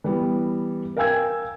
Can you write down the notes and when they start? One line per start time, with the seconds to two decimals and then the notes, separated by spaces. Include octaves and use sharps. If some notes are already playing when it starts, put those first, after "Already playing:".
0.04 E3 G3 B3
0.97 A#4 F5 G5 G#5 E6 G#6